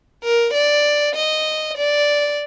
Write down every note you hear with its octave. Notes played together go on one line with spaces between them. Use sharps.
A#4
D5
D#5
D5